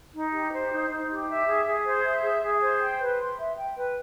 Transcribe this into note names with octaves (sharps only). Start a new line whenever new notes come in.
D#4
G4
C5
D#4
D#4
G4
E5
G#4
G#4
C5
E5
G#4
G#4
C5
G5
B4
C6
E5
G5
B4